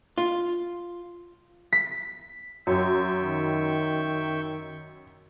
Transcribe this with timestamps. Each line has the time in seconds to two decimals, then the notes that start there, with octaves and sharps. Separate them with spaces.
0.18 F4
1.73 B6
2.67 F#2 E5 G5 C#6
3.21 D#3